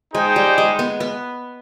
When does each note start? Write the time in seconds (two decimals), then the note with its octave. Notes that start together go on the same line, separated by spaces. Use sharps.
0.13 G#3 D#4 G#4 C5 G5
0.36 G3
0.58 G#3
0.79 B3
1.00 B3